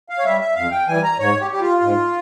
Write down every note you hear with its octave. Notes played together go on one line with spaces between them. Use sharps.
F5
C#5
G3 E5
E5
F2 F5
G5
E3 G3 G#5
A#5
G#2 C#5
G4
G3 G4
F4
G#2